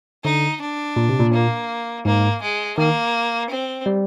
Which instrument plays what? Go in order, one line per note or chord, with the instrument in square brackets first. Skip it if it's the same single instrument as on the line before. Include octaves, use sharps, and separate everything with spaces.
[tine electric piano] D3 [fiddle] D#4
[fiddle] D4
[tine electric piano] A#2
C3
A#2
[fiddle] A#3
[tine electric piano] G#2 [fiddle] A#3
[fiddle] G#3
[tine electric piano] D#3 [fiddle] A#3
[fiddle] C4
[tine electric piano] G3